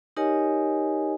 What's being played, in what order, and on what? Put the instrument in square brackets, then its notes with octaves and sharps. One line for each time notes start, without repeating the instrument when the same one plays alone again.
[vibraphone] D#4 G4 A#4 C#5 D#5 G#5